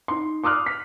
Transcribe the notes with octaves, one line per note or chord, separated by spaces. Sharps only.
D#4 C6
C6 D6 D#6 F6 F#6
B6